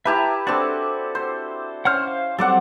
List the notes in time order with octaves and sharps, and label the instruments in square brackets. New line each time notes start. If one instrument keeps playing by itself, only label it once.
[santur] E4 G4 B4 [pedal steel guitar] E5 A5 A#5
[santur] C4 D4 A5 [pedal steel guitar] F#4 A4
[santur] C5
[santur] C#4 C5 [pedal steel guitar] F#5 F6
[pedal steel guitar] F5
[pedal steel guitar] F#3 G3 C4 [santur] A4 D5 F#5